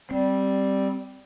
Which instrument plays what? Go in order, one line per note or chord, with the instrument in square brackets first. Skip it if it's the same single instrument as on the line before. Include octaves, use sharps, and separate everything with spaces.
[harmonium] G3 [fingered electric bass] C4